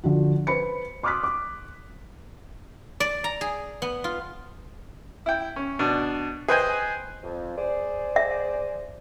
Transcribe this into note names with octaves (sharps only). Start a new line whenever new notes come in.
D3 F3 F#4
B4 C5 B5 C#7
C6 D6 D#6 F6 F#6 B6
D6
D5
A#5
G#4
B3
F4
E4 G5
C#4
B2 D4
G#4 B4 C5 D#5 G5 G#5
F2
G#4 C5 D5
E5